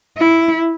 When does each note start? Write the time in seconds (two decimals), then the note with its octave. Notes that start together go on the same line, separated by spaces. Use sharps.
0.18 E4